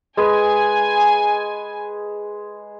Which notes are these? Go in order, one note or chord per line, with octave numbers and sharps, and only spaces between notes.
G#3 G#4 B4 G#5